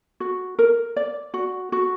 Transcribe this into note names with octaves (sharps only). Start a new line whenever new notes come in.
F#4
A#4
D5
F#4
F#4